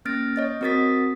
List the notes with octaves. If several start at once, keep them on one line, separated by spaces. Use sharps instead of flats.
A#3 C#4 F6 A6 A#6 D7
C#5 D#5 A6
C4 F#4 A#4 D#6 A6 B6